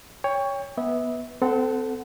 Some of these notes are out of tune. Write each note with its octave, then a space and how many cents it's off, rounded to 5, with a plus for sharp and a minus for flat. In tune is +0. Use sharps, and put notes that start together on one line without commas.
C#5 +10 G5 +30
B3 -15 B4 +0 E5 -30
C4 -30 A4 +0 F#5 +0